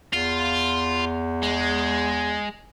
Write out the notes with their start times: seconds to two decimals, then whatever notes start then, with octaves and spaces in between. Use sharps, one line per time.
0.13 E2 F4
1.43 G#3